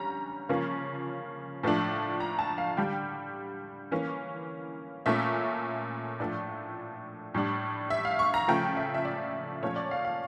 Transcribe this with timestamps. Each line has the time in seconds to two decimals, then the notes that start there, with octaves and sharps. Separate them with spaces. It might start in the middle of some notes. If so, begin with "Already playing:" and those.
Already playing: D3 G3 C#4 A#5
0.49 C#3 F3 A#3 C#4
1.63 A2 F3 A3 D4
2.20 A#5
2.39 A5
2.58 F5
2.77 D3 G3 D4 G5
3.91 E3 A#3 C#4
5.06 A#2 A3 C#4 E5
6.20 A2 F3 A3 D4 D5
7.35 A2 G3 D4
7.90 E5
8.05 F5
8.19 C#6
8.34 A#5
8.48 C#3 F3 A3 G5
8.77 E5
8.94 E5
9.05 D5
9.62 A#2 F3 A3 C#4 C#5
9.76 D5
9.91 F5
10.05 F5